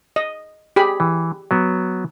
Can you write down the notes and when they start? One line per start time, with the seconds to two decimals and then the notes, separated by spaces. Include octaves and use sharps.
0.16 D#5
0.76 G4 G#4 B5
1.00 E3
1.51 F#3 B3